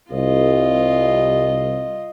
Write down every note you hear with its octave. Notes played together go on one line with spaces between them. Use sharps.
C2 F4 D#5